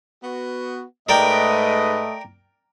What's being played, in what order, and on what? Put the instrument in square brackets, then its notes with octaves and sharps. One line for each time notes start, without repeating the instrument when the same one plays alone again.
[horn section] B3 F#4
[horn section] G#2 B4 [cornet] A3 [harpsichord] A#4 D5 G5 [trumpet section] D#5